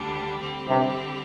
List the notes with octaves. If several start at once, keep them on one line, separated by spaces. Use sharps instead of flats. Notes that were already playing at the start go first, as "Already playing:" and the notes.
Already playing: D2 D3 G3 D4 G4
D3 G3 C4 G4
G2 C3